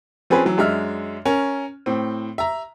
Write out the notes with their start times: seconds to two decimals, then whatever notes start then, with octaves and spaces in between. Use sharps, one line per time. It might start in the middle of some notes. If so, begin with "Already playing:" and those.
0.30 F3 C4 C#4 G#4 B4
0.45 E3 F#3
0.58 F#2 G#3 D4 E5 F6
1.25 C#4 A#4
1.86 A2 C4
2.38 E5 A#5